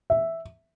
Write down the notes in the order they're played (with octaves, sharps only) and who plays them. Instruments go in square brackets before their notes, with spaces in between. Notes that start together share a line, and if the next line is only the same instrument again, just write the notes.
[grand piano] E5